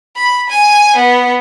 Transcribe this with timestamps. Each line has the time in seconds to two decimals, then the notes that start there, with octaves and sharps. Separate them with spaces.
0.16 B5
0.49 G#5
0.96 B3